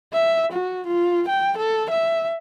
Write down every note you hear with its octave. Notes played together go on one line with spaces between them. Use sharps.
E5
F#4
F4
G5
A4
E5